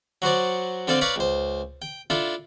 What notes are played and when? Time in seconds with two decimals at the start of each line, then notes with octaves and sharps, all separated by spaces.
0.22 F#3 F#4 C5 D5
0.88 D3 C4 A4 D5 F5 G5
1.01 B4 C#5 D5 F5 A#5 B5
1.16 C#2 C5
1.82 G5
2.10 D4 E4 F4 A4